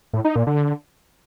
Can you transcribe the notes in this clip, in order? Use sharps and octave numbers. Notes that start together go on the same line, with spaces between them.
A2
D#4
A#2
D3